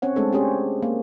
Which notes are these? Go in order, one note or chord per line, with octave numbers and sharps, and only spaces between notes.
C4 C#4 C#5 F#5
G#3 A3 C4 D4 G#4 A4
C4 C#4 G4 G#4 C5 C#5
A#3